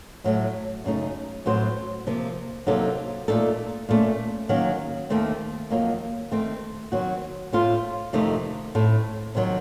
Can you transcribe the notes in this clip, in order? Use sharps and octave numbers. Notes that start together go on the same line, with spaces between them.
A2 F#3 A3
F#2 C#3 A3 D#4
A2 F#3 C4 F#4 C5
C3 F3 A#3
C3 F#3 A#3 D#4 A4
A#2 A3 D#4 A4
A#2 A3 C#4
D#3 F#3 A#3 C#4
D#2 D#3 A3 C4
F2 D#3 F#3 A#3 D#4
D#3 A3 C4
D#3 F#3 C4 F#4
A2 A3 C4 F4
F2 C3 D#3 A3 D#4
A2 A3 C4
C3 D#3 F#3